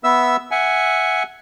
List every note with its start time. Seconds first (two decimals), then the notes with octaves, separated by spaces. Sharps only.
0.04 B3 E5 E6
0.51 E5 F#5 G#5